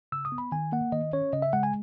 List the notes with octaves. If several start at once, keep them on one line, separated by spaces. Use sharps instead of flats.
C#3 E6
D#6
B3
B5
D#3 G#5
A#3 F#5
D#3 D#5
C#4 C#5
C#3 D#5
E5
G#3 F#5
G#5